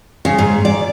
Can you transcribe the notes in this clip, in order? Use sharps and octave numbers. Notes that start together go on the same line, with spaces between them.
C#3
G#2
D5